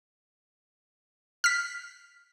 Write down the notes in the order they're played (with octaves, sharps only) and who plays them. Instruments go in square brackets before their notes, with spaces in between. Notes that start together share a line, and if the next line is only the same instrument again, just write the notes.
[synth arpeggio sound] F6 B6